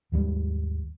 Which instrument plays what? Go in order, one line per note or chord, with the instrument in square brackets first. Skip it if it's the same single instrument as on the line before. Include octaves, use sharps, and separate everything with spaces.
[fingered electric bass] G#1 D#2 G3 G#3